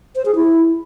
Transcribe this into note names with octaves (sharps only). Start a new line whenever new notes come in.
C5
G#4
E4